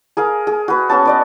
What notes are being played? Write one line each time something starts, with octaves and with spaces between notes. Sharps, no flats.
G#4 A#4 F5
G#4
F#4 B4
B3 C#4 F#4 A5
B4 D5 D#5